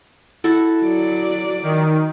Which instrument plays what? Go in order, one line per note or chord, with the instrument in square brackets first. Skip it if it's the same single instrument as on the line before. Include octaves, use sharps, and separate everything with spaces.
[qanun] E4 F#4 A4
[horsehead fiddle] F#3 D5
[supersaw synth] D#3